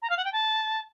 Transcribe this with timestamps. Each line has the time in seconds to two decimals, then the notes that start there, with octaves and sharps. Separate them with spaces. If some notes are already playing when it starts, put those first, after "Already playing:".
0.02 A#5
0.09 F5
0.17 F#5
0.25 G5
0.32 A5